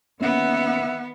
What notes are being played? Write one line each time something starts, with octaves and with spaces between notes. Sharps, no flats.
D#3 A#3 B3 C#4 E5 F#5